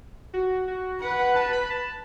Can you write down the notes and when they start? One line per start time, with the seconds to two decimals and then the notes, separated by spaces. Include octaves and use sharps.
0.33 F#4
0.68 F#4
1.02 B4 F#5
1.19 F#5
1.36 A5
1.53 B5
1.70 A5